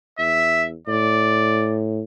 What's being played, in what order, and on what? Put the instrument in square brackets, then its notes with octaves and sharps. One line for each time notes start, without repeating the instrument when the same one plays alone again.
[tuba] E2 [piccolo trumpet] E5
[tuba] A2 [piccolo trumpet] D5